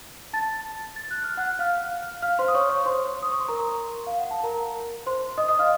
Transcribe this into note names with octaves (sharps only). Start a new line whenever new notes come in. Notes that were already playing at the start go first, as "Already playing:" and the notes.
A5 A6
A6
F#6
F6
F#5 F#6
F5 F6
F5 F6
C5 C6
D#6
C#5 C#6
C#5 C#6
C5 C6
D#6
C#6
C6
A#4 A#5
F5
F#5
A5
A#4 A#5
C5 C6
D#5 D#6
D#5 D#6
F5 F6